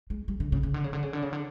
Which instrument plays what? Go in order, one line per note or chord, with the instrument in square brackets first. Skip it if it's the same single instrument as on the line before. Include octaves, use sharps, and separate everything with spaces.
[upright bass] G#3
G3
D3
C#3
C#3
D3
C#3
D3
C#3
D3
C#3
D3